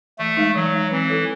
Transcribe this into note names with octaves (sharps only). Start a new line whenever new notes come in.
E3 A3
G#3 D#4
E3 F#3
G#3 D#4
E3 C4
E4 A4 C#5